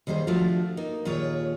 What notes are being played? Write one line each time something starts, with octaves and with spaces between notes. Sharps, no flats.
D#2 D#3 G3 G#4 C5
F3 A3 D4 F4 F#4
A#3 D#4
D#2 A#2 F4 G#4 C#5